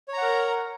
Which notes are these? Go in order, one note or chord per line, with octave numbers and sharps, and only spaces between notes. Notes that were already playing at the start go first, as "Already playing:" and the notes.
A#4 C#5 F#5 A#5